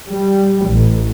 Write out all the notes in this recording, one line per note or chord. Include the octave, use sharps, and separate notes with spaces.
G3
A1